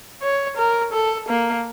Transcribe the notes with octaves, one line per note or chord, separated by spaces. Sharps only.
C#5
A#4
A4
A#3